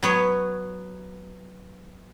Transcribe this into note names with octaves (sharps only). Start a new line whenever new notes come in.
F#3 B3 C#5